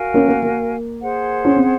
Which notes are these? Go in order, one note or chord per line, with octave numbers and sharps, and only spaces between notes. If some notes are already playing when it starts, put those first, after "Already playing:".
Already playing: F#4 A#4 F5 G#5
A#3 C#4
A#3
A#3
G#4 C5 F#5
C#4
C4